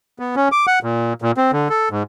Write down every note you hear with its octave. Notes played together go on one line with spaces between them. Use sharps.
B3
C#4
D6
F#5
A#2
A#2
C4
D3
A4
G#2